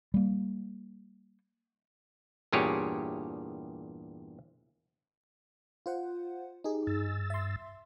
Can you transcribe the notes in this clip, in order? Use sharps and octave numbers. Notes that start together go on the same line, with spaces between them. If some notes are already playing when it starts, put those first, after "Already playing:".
G3 A#3
E2 G2 A#2 G4 G#4 C#5
F4 C5 F#5
D#4 G4 G#4
G2 E6 A6
E5 C6